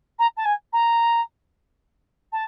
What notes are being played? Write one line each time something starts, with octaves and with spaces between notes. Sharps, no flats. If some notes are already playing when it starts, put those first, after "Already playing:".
A#5
A5
G#5
A#5
A5